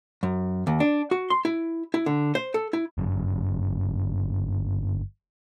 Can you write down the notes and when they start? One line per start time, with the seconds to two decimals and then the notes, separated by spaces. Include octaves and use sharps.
0.23 F#2
0.67 D#2
0.80 D4
1.11 F#4
1.30 C6
1.45 E4
1.94 E4
2.06 D3
2.35 C5
2.54 A4
2.73 E4
2.98 G1 F#2